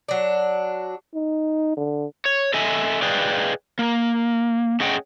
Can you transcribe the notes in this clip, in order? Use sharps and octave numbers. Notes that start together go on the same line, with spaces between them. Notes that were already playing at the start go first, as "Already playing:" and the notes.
F#3 D4
D#4
D3
C#5
A4 D#5 E5 G#5
G#4 B4 D5 D#5 F5 G5
A#3
A3 C#4 G#4 D#5 F#5 G5